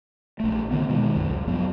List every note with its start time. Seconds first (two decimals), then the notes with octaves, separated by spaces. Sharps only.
0.40 A#1 A3
0.71 D3 D#3 B3
0.89 B2 D#3 G#3
1.16 C2 F#2
1.30 C#2
1.47 F#2 F3 F#3 B3